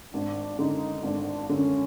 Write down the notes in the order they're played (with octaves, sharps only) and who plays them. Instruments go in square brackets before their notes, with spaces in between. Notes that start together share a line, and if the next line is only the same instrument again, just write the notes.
[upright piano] G#1 [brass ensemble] D4
[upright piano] F#2 D3 [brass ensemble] D#4
[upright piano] G#1 [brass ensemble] D4
[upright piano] F#2 D3 [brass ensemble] C#4